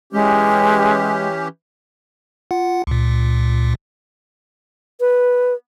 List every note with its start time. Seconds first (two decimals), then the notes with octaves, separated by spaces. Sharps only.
0.13 E3 G#3 C#4 G4
2.51 F4 F#5
2.87 C#2 A#2
5.00 B4